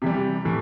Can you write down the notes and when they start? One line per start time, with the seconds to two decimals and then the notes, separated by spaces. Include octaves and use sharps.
0.02 C3 E3 G3 G4
0.45 A2 E3